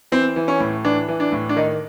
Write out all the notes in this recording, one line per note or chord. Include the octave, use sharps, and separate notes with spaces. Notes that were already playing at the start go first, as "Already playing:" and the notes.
E3 C4
E3
C#4
A2
E3 D4
E3
D4
A2
D4
D#3 D#4